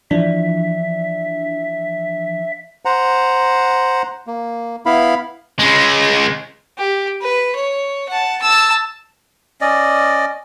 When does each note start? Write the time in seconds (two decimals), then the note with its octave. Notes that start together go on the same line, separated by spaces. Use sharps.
0.11 E3 F3 D4 E5
2.85 C5 F#5 A#5
4.27 A#3
4.86 B3 E4 F5 B5
5.59 C#3 G#3
6.78 G4
7.21 B4
7.56 C#5
8.08 F#5 A5
8.42 A5 E6
9.61 C#4 D5 D#5